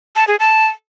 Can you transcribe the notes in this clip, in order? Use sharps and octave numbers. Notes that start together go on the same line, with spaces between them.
A5
G#4
A5